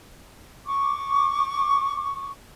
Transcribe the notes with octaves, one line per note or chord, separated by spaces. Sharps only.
C#6 D6